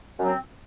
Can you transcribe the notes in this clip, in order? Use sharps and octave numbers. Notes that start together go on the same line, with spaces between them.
F#2 F#3 C4